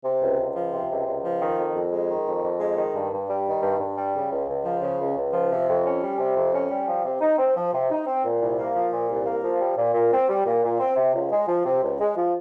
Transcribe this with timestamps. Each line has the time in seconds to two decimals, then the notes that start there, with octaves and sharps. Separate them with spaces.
0.05 C3
0.22 C#2
0.39 C#2
0.56 F3
0.73 C3
0.90 C#2
1.06 C#2
1.24 F3
1.41 D#3
1.58 F2
1.74 F2
1.93 G#3
2.09 D#3
2.26 F2
2.44 F2
2.60 G#3
2.77 D#3
2.95 G2
3.12 G2
3.29 G3
3.46 D#3
3.62 G2
3.80 G2
3.97 G3
4.15 C#3
4.32 C#2
4.48 C#2
4.65 F3
4.82 C#3
5.00 C#2
5.16 C#2
5.33 F3
5.51 C3
5.68 F2
5.85 C#4
6.03 G3
6.19 C3
6.36 F2
6.53 C#4
6.70 G3
6.87 F3
7.05 C3
7.21 D#4
7.38 C4
7.56 F3
7.73 C3
7.90 D#4
8.07 C4
8.24 A#2
8.40 C2
8.58 A#3
8.75 F3
8.92 A#2
9.10 C2
9.26 A#3
9.43 F3
9.61 G3
9.77 A#2
9.94 A#2
10.12 C4
10.29 G3
10.46 A#2
10.64 A#2
10.79 C4
10.96 C3
11.14 C#2
11.31 G#3
11.48 F3
11.66 C3
11.83 C#2
12.00 G#3
12.17 F3